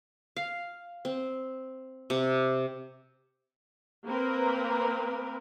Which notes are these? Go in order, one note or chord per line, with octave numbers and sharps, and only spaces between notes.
F5
C4
C3
A#3 C4 A#4 B4